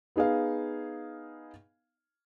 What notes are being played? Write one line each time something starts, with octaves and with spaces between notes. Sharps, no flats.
B3 D#4 G#4 B4 F5